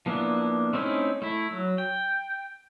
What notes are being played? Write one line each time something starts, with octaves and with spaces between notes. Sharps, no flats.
F3 A#3 B3 D4 E4
A3 C4 C#4 D#4 E4
A3 E4
F#3
G5